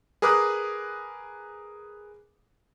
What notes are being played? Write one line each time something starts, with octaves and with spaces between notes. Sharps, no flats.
G#4 A#4 B4 D6 D#6 F#6